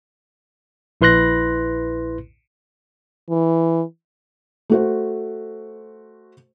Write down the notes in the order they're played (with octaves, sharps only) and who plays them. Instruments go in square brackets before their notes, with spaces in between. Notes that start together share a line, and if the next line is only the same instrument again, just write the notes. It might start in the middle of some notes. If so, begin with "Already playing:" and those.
[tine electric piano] A#1 E4 B4 C6 F#6 A#6
[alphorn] E3
[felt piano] A3 F#4 C5